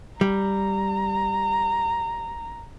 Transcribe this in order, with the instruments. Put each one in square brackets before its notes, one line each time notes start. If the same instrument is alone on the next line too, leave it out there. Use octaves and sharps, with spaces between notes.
[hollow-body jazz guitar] G3 [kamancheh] A#5